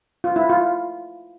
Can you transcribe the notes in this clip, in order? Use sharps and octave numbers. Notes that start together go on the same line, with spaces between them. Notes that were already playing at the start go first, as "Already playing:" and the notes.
F4
E4
F4